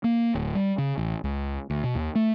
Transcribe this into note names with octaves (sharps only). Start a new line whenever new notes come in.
A#3
D1
G3
C#3
A1
C#2
D2
B2
D#2
A3